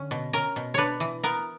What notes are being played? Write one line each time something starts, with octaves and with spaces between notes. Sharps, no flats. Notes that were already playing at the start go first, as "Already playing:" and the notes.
Already playing: D3 C#4
B2
C#4 A#4
B2
D4 B4 C#5
E3
B3 A#4